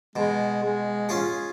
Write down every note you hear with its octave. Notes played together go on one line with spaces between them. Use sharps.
B2 G#3
G#3
C#4 F4 G#4